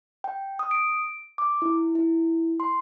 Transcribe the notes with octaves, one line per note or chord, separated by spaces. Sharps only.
G5
D#6
D7
D6
E4
E4
C6